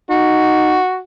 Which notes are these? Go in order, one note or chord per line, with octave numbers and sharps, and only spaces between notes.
D#4 F#4